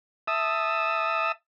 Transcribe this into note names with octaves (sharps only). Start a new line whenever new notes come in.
E5 A5 D#6 E6